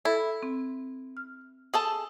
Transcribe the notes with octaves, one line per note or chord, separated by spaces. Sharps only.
E4 A4
C4
F6
G#4 A4 A5